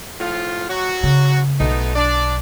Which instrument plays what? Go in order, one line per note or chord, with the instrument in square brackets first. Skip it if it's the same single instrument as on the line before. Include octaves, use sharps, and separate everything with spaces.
[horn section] A2 F3 F4
F#3 F#4
[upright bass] C#3
[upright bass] B1 [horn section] A3 B3 D#4
[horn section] D4 D5